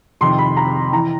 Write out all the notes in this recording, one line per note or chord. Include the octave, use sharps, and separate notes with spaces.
F2 C3 D#3 C6
B5
A#5
E3 A#5